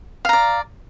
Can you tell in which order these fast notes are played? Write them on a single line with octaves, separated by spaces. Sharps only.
F5 A#5 D5